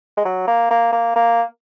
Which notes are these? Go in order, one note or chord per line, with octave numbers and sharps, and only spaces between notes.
G#3
F#3
A#3
A#3
A#3
A#3